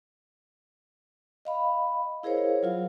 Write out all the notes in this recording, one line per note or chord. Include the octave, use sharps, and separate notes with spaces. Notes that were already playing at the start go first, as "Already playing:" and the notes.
D#5 F5 B5
E4 G#4 A#4 C5 C#5 F5
F#3 F4 F5